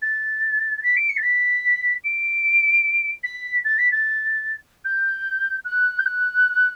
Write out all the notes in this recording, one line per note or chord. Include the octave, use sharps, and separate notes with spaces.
A6
A6
B6
D7
C#7
A6
B6
D7
B6
A6
B6
A6
G6
F#6
G6
F#6